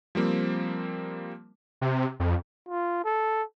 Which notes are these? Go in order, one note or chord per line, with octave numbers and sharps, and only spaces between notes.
F3 G3 A#3 C4
C3
F2
F4
A4